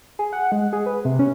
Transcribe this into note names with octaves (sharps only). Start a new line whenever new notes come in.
G#4
F#5
G#3
G#4
B4
C3
C#4